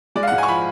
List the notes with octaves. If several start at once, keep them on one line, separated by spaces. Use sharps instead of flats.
G#3 D5
F5
F#5
G#2
G#5
C#6
F3 B5